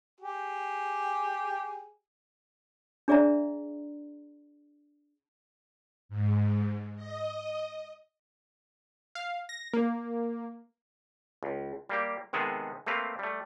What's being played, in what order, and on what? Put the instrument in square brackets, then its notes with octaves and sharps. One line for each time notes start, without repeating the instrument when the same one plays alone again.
[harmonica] G4 G#4
[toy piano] D4 G#4 D5 E5 A#5
[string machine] G#2
D#5
[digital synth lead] F5
A#6
A#3
[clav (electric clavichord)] C#2
G3 A#3 G4
C3 D#3 G#3 B3 G#4 A4
A3 A#3 C4 B4 F5
G3 A3